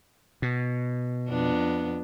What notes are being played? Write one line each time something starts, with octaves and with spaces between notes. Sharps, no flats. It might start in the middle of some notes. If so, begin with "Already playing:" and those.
B2
F2 B3 D4